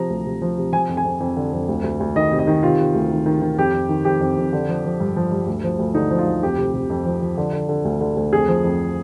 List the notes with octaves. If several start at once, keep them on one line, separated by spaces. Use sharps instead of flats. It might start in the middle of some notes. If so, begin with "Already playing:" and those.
Already playing: C3 F3 A#5
D2
C3
F3
C3
F3 G#5
F2
G#5
F2
F2
D3
F2
D2
D2
D2
D#3 D#5
C3
D#5
D#3
C3 F4
C3
D2
D#3
D#3
D#3
F2 G4
F2
D#3
F2 G4
F2
F2
D3
F3
F3
G2
F3
G2
D2
F3
D2
D3 D#4
F3
F4
D2
F2 G4
C3
C3
F2
F3
F3
D3
D3
D3
D2
D3
D2
F2 G#4
F3
F2